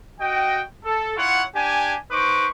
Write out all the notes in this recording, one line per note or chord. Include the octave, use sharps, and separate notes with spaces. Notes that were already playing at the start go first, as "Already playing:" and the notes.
F#4 D#5 G5
A4
E4 F4 C#5 F#5
D4 G4 G#5
D#4 B4 C5 C#6 D6